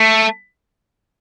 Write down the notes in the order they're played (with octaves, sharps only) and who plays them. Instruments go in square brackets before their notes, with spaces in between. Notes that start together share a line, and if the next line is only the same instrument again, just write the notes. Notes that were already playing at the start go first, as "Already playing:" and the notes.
Already playing: [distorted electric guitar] A3